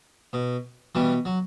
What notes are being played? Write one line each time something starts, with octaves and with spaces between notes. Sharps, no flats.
B2
B2 E3 G3
F#3